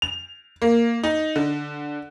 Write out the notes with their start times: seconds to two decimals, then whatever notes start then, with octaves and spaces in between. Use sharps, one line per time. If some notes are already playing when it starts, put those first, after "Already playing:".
0.02 F7
0.62 A#3
1.03 D#4
1.36 D3